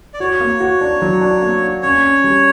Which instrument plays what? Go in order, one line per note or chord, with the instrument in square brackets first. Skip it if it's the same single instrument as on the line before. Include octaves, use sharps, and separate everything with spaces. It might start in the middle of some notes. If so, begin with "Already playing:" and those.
[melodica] D5
[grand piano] F#4 [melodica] C#5
[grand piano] A#3
F#4
D4
F#3
D4
A#3
D4
[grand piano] C#4 [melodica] C#5
[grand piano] C#4
G3